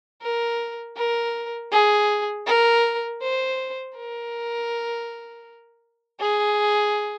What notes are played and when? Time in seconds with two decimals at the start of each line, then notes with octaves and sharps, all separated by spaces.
0.22 A#4
0.97 A#4
1.72 G#4
2.46 A#4
3.21 C5
3.96 A#4
6.20 G#4